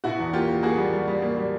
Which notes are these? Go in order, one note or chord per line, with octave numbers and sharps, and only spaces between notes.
B2 E4 F#4
E2
A#3 F4 G4
A#3
A#3 F#4 G#4
G3
G3
G3
A#3
G3